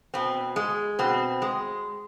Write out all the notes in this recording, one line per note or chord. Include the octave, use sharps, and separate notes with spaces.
B2 C4
G#3
B2 C4
G#3